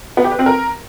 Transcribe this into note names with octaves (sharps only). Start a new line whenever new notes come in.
B3
G4
B4
C4
A#4